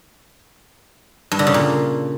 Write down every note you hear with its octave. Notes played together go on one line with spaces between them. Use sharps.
G2
D3
C#3
A#2